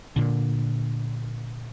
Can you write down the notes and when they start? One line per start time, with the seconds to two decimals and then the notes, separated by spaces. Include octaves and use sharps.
0.16 A#2 D3